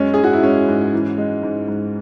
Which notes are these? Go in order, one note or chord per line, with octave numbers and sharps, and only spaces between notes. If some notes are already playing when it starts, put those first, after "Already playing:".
Already playing: F#2 G#3 C#4
G#2 G#4
F#4
E4
G#3 C#4
G#2
E3
G#3
G#2
G#2